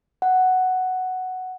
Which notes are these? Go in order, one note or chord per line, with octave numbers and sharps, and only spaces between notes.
F#5